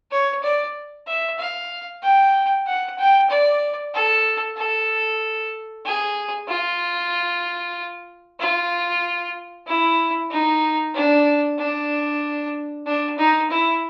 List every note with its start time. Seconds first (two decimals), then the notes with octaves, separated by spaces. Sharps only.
0.11 C#5
0.43 D5
1.07 E5
1.39 F5
2.03 G5
2.66 F#5
2.98 G5
3.30 D5
3.94 A4
4.57 A4
5.85 G#4
6.49 F4
8.40 F4
9.67 E4
10.31 D#4
10.94 D4
11.58 D4
12.86 D4
13.18 D#4
13.50 E4